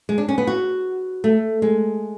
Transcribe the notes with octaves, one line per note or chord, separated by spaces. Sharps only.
G#3
D4
C#4
B3
F#4
A3
G#3